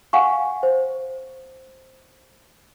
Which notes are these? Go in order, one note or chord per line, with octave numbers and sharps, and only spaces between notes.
F5 F#5 G#5 C#6
C5